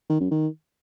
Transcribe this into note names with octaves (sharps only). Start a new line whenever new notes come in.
D#3
F#2
D#3